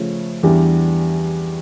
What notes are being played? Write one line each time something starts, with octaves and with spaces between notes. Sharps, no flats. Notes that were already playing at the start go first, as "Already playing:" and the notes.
Already playing: C#3 F3 A3 C#4
E2 E3 G3 D4 G4